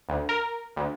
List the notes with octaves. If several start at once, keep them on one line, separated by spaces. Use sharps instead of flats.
D2
A#4
D2